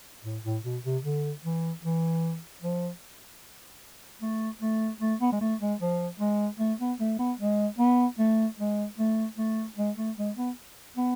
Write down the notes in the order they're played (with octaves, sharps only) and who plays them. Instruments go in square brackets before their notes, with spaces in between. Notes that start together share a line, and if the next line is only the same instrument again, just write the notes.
[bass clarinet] A2
A2
B2
C3
D3
E3
E3
F3
A3
A3
A3
B3
G#3
A3
G#3
F3
G#3
A3
B3
A3
B3
G#3
B3
A3
G#3
A3
A3
G#3
A3
G#3
B3
B3